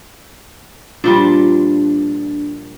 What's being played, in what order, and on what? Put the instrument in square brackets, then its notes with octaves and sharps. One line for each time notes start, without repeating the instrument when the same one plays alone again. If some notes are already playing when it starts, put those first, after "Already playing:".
[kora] A#2 F3 G3 [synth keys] D4